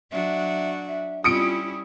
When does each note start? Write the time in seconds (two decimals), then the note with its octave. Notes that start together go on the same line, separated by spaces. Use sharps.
0.12 F#3 D4 F#4 E5
0.88 E5
1.24 G3 C#4 E4 F4 D#6 C#7 D7